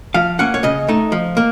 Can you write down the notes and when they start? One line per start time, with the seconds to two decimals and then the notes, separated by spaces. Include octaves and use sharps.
0.14 F3 F5
0.39 A#3 C#4 F#5
0.54 C#5
0.63 C#3 D#5
0.88 A3 D#4
1.12 F3
1.37 A#3